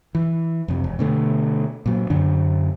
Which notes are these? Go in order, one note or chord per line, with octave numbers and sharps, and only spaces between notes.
E3
F2 C3
E1
B2 D3 A3
A#2 F#3
F#2 D3 D4